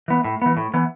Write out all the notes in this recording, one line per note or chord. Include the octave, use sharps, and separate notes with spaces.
E3 B3
A2
E3 B3
A2
E3 B3